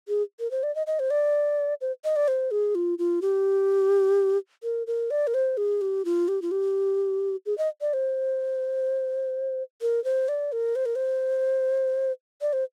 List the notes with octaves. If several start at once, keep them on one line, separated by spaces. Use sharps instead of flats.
G#4
A#4
C5
D5
D#5
D#5
C5
D5
C5
D#5
D5
C5
G#4
F4
F4
G4
A#4
A#4
D5
A#4
C5
G#4
G4
F4
G4
F4
G4
G#4
D#5
D5
C5
A#4
C5
D5
A#4
C5
A#4
C5
D5
C5